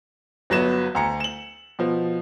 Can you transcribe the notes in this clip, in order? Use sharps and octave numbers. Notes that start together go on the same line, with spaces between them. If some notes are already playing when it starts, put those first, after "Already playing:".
G1 F#3 B3 E7
D2 A#5 C#7
E7 F#7
B2 F3